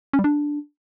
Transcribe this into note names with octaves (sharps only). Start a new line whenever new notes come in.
C#4
G3
D4